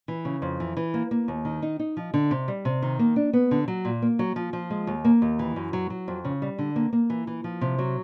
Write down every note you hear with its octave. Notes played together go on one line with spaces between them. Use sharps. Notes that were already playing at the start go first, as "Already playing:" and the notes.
E3
C#3
F2
E3
E3
A#3
A#3
D#2
D#3
D#4
D#4
F3
D3
C3
G3
C3
D#3
A#3
D4
B3
D3
F#3
A#2
A#3
F#3
F3
F3
G#3
D#2
A#3
D#2
E3
F#2
F#3
F#3
F2
C#3
G3
D3
A#3
A#3
E3
E3
F3
C3
F#3